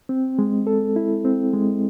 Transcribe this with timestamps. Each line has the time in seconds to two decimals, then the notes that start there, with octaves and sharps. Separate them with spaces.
0.09 C4
0.39 G#3
0.67 A4
0.96 E4
1.25 C4
1.53 G#3